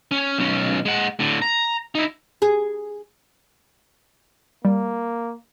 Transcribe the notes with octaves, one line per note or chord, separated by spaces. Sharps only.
C#4
B1 C#4
G#3 F#5
A2 D3
A#5
D#4 E4
G#4
G3 A#3